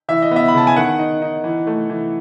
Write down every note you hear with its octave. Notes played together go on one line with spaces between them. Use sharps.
E3 E5
D#5
B3 E5
B5
C#3 A5
G#5
D#3 F#5
D#4
D#4
E3
A3
E3